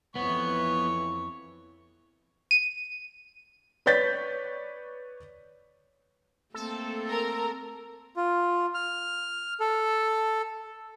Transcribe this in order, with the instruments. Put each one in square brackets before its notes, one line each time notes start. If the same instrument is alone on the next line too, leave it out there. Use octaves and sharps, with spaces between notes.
[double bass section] F2 E3 [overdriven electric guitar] B3 [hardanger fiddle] C#5
[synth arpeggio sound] D#7
[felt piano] B4 C#5 D5 G6 A6 B6
[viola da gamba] A3 A#3 C4 [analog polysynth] A4
[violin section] A#4 A#5
[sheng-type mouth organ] F4
F6
A4